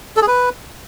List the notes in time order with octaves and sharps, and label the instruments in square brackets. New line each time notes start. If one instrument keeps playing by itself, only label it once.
[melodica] A4
G#4
B4